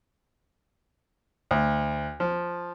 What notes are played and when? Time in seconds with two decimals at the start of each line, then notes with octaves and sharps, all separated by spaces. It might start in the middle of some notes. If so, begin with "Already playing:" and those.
1.51 D2
2.20 F3